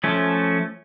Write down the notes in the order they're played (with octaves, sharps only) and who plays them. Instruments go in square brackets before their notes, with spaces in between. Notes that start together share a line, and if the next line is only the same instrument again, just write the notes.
[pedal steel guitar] F3 A3 C#4